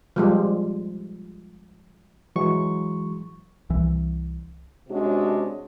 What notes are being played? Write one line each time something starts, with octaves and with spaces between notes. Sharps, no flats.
F3 G3 G#3
E3 F#3 G#3 C#6
C2 E3
C3 G#3 C#4 D4 F#4